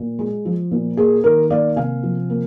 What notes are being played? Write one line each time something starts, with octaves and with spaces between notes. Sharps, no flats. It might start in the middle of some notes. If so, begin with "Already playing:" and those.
Already playing: A#2
G#3
F3
A#2
A#3 G#4
D#3 A#4
A#3 D5 F5
C3 F5 G#5
F3
A#3